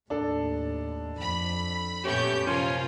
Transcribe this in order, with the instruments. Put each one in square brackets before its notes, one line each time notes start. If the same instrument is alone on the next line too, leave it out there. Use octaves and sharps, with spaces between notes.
[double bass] D#2 A2 [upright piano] D4 A4
[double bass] F2 [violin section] B5
[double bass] F#2 A#2 [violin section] A3 C#6 G6 [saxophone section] B3 C#4 G4
[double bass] C3 [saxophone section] F3 C#4 [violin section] A#3 F4 [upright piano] C6